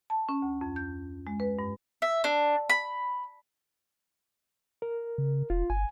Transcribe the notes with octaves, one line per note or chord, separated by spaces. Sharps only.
A5
C#4
D2
F2
G6
G#3
B4
G2
E5
D4
B5
A#4
C#3
E1 F4
G1 G#5